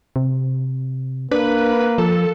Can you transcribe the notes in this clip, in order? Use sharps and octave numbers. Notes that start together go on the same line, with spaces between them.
C3
A#3 D4 B4
F3 A4